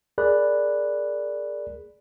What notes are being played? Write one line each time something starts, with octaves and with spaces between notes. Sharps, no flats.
G#4 A#4 D5 B5 F#6